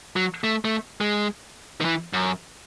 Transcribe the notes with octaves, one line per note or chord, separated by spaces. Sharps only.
F#3
A3
A3
G#3
D#3
E3
F#2